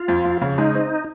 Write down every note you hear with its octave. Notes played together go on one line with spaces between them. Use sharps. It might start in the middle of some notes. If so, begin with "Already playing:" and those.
Already playing: F4
F2
F2
C#3
G#3 D#4
C4